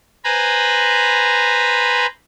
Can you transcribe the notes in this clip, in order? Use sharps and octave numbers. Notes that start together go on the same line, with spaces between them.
B4 C5 G#5 A#5 B5